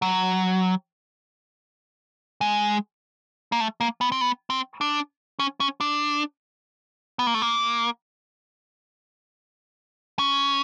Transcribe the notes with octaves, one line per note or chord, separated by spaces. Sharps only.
F#3
G#3
A#3
A3
A#3
B3
C4
B3
C4
D4
C#4
C#4
D4
B3
A#3
A3
A#3
C#4